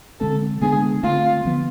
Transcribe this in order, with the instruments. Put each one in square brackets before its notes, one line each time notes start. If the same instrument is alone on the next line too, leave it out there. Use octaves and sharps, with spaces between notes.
[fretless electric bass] D3 G#3 C4 [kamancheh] A4
[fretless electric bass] D3 G#3 B3 D4 [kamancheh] G#4
[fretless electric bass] D3 A3 C4 [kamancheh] F4
[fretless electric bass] D3 F3 B3